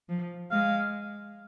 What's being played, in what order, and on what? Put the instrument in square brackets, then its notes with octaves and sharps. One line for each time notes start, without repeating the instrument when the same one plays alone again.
[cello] F3
[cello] G#3 [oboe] F5